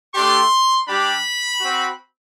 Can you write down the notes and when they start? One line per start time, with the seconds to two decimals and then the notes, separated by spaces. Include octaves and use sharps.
0.13 A3 D4 G4 C6
0.87 G3 D4 G4 B5
1.60 C4 F#4